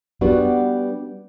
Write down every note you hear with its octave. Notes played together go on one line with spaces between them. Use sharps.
G3 B3 D4 F#4